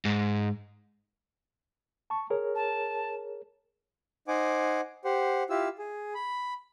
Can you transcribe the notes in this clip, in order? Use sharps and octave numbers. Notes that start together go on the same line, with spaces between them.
G#2
A5 C#6
G#4 A#4 C#5
A5
D#4 C5 F#5 G#5 D6
G4 C5 F#5
E4 F4 G4 E6
G#4
B5